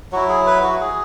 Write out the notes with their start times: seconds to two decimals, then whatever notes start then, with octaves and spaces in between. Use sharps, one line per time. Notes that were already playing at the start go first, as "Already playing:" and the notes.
0.12 F#3 E4 F#4
0.29 G#4
0.47 B4
0.64 F#4
0.81 G#4